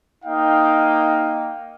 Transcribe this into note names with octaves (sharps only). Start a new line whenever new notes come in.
A#3 D#4 D#5 F5 G5